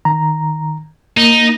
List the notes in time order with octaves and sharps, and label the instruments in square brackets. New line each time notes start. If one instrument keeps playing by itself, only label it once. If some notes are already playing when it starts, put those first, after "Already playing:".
[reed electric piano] D#3 A#5
[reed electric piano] A#3 [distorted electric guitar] D#4